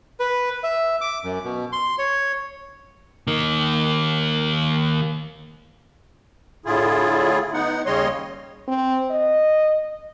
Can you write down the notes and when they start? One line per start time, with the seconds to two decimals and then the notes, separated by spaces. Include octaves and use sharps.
0.20 B4
0.64 E5
1.01 D6
1.24 F#2
1.44 B2
1.72 C6
1.98 C#5
3.27 D#3 A#3
6.66 A2 D3 E4 F4 G#4
7.54 B3 D#4 F#5
7.86 D#2 C#3 G3 C#5 D#5 C6
8.68 C4
9.11 D#5